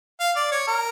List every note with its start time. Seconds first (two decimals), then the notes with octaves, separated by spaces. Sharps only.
0.20 F5
0.36 D5
0.52 C#5
0.67 A#4